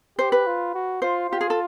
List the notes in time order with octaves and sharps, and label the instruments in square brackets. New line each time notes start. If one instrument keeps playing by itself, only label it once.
[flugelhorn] G4 [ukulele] C5
[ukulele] B4
[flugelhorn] F4
F#4
[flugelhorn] F4 [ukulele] C5
[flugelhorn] F4 [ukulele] G4
[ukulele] G#4
A4